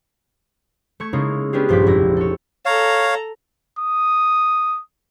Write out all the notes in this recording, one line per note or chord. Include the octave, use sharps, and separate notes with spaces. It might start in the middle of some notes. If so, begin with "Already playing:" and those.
A3 C#6 G#6
C#3 G#3 A#3 D#4 E4
B3 C#4 D4 G4 G#4
A#1 G2 F3 D6 G6 B6
F1 E4 A#6
A4 C#5
A4 C#5 F5 A#5
D#6